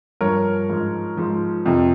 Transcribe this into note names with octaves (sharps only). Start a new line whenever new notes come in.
G2 F3 A#4 C#5
G#2 F3
G#2 F3
F2 C3 F3